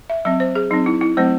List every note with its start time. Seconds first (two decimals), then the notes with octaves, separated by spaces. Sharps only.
0.10 E5
0.25 F#3 C4 E5
0.40 C5
0.55 G#4
0.71 F#3 C4 D#4
0.86 E4
1.01 E4
1.17 F#3 A3 C4 C5